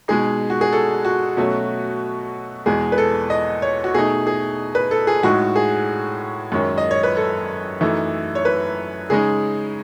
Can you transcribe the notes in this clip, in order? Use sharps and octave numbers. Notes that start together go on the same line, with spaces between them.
B2 G#3 D#4 G#4
F#4
G#4
A4
F#4
B2 F#3 A3 C#4
E2 B2 G#3 G#4
B4
A4
D#5
C#5
F#4
B2 A3 D#4 G#4
G#4
B4
A4
G#4
A2 G#3 D#4 F#4
G#4
F#2 D#3 G#3 C#4
D#5
C#5
B4
A4
F#2 E3 A3 D#4
C#5
B4
C#3 G#3 D#4 G#4